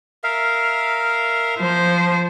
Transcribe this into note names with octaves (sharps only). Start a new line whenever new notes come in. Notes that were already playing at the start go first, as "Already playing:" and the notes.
A#4 E5 F5
F3 C5